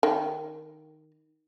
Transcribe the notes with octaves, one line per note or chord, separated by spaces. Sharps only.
D#3